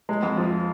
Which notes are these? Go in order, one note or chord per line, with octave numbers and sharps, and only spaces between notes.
G#3
F2
F3